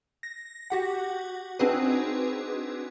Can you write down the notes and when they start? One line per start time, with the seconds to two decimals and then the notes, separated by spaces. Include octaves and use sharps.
0.23 A#6
0.70 F#4 G4 F#5
1.59 C4 D4 D#4 F#4 G#4 B4